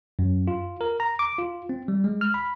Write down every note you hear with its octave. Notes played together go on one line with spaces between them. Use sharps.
F#2
F4
A#4
A#5
D6
F4
C4
G3
G#3
F6
B5